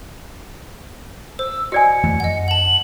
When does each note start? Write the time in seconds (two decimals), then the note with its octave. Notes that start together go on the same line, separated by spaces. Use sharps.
1.39 C5 E6
1.72 F#4 D5 D#5 G#5 C#7
2.04 F2 E3 A3
2.20 F#2 D#5 F#5
2.48 F#5 A5 F#7